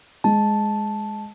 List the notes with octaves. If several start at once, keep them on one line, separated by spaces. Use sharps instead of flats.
G#3 A5